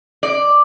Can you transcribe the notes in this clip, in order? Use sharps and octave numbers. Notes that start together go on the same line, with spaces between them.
D5